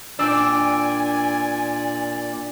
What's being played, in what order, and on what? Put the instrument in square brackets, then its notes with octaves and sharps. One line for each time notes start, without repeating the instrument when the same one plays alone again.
[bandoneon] A#2 D5 [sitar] D4 [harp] G5 D6 E6 [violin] G#5